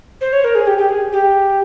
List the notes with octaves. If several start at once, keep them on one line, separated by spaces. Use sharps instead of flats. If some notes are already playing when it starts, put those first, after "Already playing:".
C5
C#5
A#4
G#4
G4
G4
G#4
G4